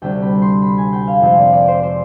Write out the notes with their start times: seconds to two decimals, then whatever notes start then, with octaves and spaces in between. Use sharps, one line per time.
0.02 D2 C3 G3 D4 G5
0.22 B5
0.42 C6
0.62 B5
0.78 G#5
0.93 G5
1.08 F5
1.20 F2 C3 F3 G#3 C5
1.38 D5
1.53 D5
1.68 C5
1.83 C5